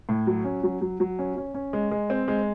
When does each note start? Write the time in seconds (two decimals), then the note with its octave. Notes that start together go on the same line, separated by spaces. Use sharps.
0.09 A2
0.27 F#3
0.44 C#4
0.64 F#3
0.81 F#3
1.00 F#3
1.19 C#4
1.37 C#4
1.54 C#4
1.73 G#3
1.91 G#3
2.10 C4
2.28 G#3